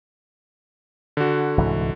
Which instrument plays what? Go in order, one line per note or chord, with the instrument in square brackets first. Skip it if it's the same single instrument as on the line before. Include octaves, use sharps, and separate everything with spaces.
[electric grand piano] D3 F#4
[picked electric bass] C2 G#2 E3